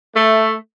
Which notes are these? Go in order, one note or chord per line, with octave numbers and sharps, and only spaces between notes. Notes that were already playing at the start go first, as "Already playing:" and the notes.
A3